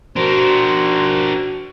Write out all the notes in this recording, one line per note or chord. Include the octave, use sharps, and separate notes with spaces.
D4 F#4 A#4 C5